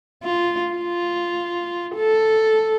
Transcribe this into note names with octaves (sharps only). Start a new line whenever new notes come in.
F4
F4
A4